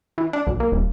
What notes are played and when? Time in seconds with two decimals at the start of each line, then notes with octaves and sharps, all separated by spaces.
0.18 E3
0.33 D4
0.47 B1
0.60 A#3
0.72 D#1